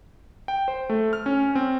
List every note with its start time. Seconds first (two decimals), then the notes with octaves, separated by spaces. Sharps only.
0.48 G5
0.68 C5
0.90 A3
1.13 F6
1.26 C#4
1.55 C4